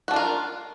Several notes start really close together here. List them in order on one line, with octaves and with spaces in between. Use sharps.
F#4 D4 F4 A#4